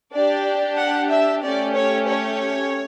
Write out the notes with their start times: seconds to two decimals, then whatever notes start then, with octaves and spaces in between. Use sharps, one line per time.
0.14 D4 G4 D5
0.79 F#5
1.12 E5
1.44 A3 C#4 G4 D5
1.76 C#5
2.09 C#5